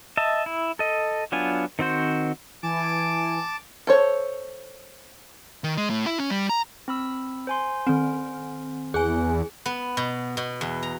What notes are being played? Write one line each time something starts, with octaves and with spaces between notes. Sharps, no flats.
D#5 E5 A5
E4
A4 D#5
F#3 B3 D4 F4 G#5
D#3 C4 F#4 C5
E3 G#5 A5 D6
A4 C5 C#5
D#3
G#3
A2
E4
C#4
G3
A#5
C4 B5 E6
C5 G#5 C6
D#3 C4
E2 G#4 G#5 F#6
B3
B2
B2
E2
A#5